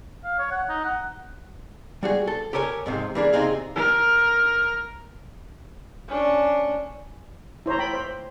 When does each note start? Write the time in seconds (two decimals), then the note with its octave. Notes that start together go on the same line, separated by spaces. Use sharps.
0.24 F5
0.39 C#5
0.51 F#5
0.69 D#4
0.84 F#5
2.03 G3 F#4 G#4
2.27 A4
2.53 G4 A4 A#4 C#5 G#5
2.86 F2 G#2 C3
3.15 E3 A#3 D4 G#4
3.33 C3 C4 D#4 G#4 F5
3.76 A#4
6.09 C#4 D4
7.66 E4 C5 C#5 A#5
7.79 G5 B5
7.94 C5